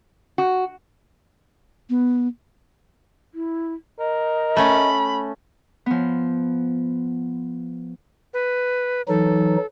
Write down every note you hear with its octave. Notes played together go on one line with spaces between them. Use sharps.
F#4
B3
E4
A#4 D#5
A3 C#4 B5
F3 B3
B4
E3 F#3 D#4 A4